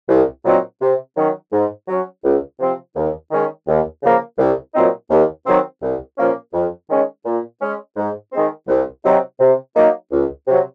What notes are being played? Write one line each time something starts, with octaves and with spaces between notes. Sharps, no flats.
C2
A#2 F#3 C4 D#4
C3
D#3 F#3 C#4
G#2
F#3 C#4
C#2
C3 F3 C4
D#2
D#3 G#3 C#4
D#2
C#3 F3 A#3
C2
A#2 F#3 C4 D#4
D#2
D#3 F#3 C4
C2
A#2 F3 A#3 C#4
F2
D#3 G#3 C#4
A#2
G#3 C#4
G#2
D#3 G#3 C4
C2
C3 F#3 C4 D#4
C3
F#3 A#3 D#4
C#2
C3 F#3